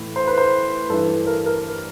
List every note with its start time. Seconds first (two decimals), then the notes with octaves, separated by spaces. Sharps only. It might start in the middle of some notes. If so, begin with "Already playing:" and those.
Already playing: A2 E3
0.16 C5
0.27 B4
0.38 C5
0.90 G2 E3 A4
1.27 A#4
1.46 A#4